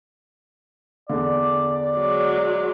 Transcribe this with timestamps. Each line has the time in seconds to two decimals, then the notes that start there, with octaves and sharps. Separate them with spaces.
1.09 E2 D3 D5
1.96 F#3 G#3